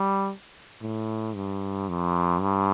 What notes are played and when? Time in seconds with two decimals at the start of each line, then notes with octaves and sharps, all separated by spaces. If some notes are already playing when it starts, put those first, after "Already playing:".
Already playing: G3
0.82 A2
1.35 G2
1.89 F2
2.41 G2